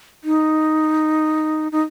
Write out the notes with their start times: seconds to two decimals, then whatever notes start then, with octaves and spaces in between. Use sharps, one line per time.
0.24 D#4
1.72 D#4